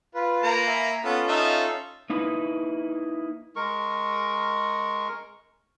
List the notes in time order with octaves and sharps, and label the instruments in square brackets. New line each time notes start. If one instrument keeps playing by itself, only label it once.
[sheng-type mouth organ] F4 B4
[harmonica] A#3 A#5
[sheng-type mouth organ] E5 G#5 B5
[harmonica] B3 [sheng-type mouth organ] C#4 F4 A4
[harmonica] D#4 E5 F5
[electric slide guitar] A#3 D#4 E4 B4
[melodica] G#3 A#4 C#6